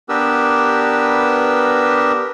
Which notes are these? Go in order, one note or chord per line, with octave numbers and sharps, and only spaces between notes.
B3 D4 G4 A#4 B4 E6